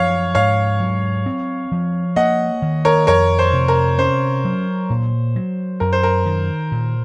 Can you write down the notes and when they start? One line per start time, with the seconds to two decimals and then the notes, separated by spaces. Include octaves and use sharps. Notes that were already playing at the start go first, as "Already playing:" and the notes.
Already playing: F#2 F3 C#5 F5
0.35 G#2 C#5 F5
0.80 F#3
1.26 C4
1.72 F3
2.16 A#3 D#5 F#5
2.62 D#3
2.85 A#4 C#5
3.07 F2 A#4 C#5
3.39 C5
3.53 C3
3.68 A#4
3.98 C#4 C5
4.45 F#3
4.90 A#2
5.36 F#3
5.80 F#2 A#4
5.93 C5
6.03 A#4
6.26 D#3
6.72 A#2